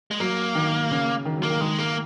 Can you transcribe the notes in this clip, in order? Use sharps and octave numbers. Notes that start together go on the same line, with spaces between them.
G#3
F#3 A#3
D#3
C#3
D#3
F#3
A#3
D#3
D#3 G#3
A#3